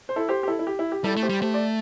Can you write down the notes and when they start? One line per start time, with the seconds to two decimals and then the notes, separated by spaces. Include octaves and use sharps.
0.09 C5
0.16 E4 A4
0.29 G4 C5
0.43 G4
0.48 E4 A4
0.59 E4
0.67 G4
0.79 E4
0.92 G4
1.04 G3 E4 A4
1.16 A3
1.23 G4 C5
1.29 G3
1.42 A3 G4 C5
1.54 A4 D5